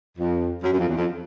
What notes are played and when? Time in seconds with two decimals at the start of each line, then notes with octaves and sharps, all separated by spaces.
0.18 F2
0.63 F#2
0.73 F#2
0.78 F2
0.87 E2
0.97 F2